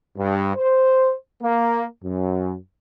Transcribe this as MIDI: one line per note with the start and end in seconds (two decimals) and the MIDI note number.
0.18 0.54 43
0.56 1.14 72
1.42 1.83 58
2.04 2.55 42